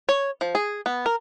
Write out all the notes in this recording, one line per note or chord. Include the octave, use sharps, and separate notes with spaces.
C#5
F3
G#4
B3
A#4